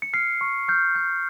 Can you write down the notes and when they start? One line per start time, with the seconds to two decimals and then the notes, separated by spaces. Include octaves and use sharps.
0.02 C#7
0.13 F6 C7
0.41 C#6
0.68 F6 G6
0.95 G6